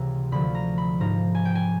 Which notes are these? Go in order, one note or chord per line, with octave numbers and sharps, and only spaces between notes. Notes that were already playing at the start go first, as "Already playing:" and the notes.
Already playing: C#2 C3 E3 A#5
D2 D3 F3 B5
A#5
B5
G#2 F3 A#5
G#5
G5
G#5